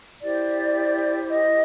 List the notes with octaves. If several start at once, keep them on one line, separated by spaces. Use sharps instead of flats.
E4 G4 C5 D5
D#5